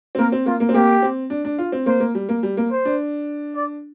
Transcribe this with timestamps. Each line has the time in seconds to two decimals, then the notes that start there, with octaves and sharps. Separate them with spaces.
0.15 C4
0.18 A#3 A#4
0.32 C4
0.46 A#3 F4
0.60 A#3
0.69 C4
0.74 A#3 G4
1.02 C4
1.30 D4
1.45 D4
1.58 F4
1.72 C4
1.86 A#3 C5
2.00 A#3
2.15 G3
2.29 A#3
2.43 G3
2.57 A#3
2.71 C5
2.85 D4
3.56 D5